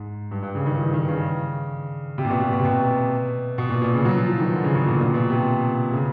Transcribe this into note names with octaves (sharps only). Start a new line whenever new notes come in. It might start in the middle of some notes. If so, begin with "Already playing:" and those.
Already playing: G#2
G2
G2
C#3
D#3
E3
D#3
C#3
C3
A#2
B2
A#2
B2
C3
B2
B2
A#2
A#2
C#3
F#3
F3
E3
D#3
D3
C#3
B2
A#2
A#2
B2
C3
C#3